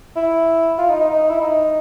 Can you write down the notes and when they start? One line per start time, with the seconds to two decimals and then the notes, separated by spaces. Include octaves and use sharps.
0.16 E4
0.79 F4
0.90 D#4
1.00 D#4
1.10 D#4
1.30 E4
1.41 D#4